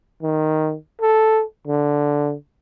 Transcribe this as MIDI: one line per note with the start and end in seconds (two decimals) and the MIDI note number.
0.23 0.75 51
1.01 1.43 69
1.67 2.34 50